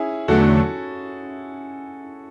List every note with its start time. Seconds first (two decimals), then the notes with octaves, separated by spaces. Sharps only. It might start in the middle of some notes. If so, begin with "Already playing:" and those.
Already playing: C#4 E4 G#4
0.28 E2 D3 F#3 A3 D4 F#4 A4